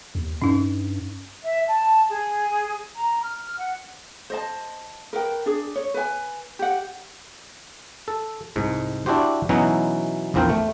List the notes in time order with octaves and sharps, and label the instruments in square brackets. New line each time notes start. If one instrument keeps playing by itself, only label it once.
[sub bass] D#2
[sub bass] G2 [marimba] C#4 D#4
[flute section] E5
A5
G#4
A#5
F6
F#5
[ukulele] C5 D#5 A5
A#4 B4 G5
D4 G#4
C#5
B4 G#5
G4 F#5
[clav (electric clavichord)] A4
C2 G#2
D4 E4 F#4 G4 C5
B2 E3 F#3 C#4 D#4 E4
A#1 E2 F3 C4 A#4 G5
A3